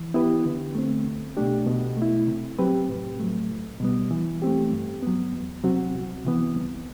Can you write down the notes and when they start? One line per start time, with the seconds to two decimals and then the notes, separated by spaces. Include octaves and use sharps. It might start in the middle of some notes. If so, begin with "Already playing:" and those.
Already playing: E3
0.14 B3 E4 G4 B4
0.45 D3
0.75 A3 C4
1.05 C2
1.37 B2 A3 D4 G4
1.66 B2
1.97 A3
2.02 E4
2.28 C3
2.59 F#3 C4 G4 B4
2.89 A2
3.20 F#3 A3
3.50 C2
3.80 B2 G3 B3
4.11 E3
4.42 A3 C4 G4
4.72 G2
5.03 F#3 B3
5.33 E2
5.64 C3 F#3 C4 F#4
5.95 C2
6.25 C3 E3 B3
6.55 C2